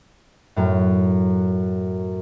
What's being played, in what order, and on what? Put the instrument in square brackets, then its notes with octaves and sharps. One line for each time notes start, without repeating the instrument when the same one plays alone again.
[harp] F#2 A2